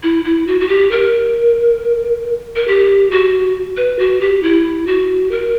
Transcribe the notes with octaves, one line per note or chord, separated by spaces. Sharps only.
E4
E4
F#4
F#4
G4
A#4
A#4
G4
F#4
B4
F#4
G4
E4
F#4
A#4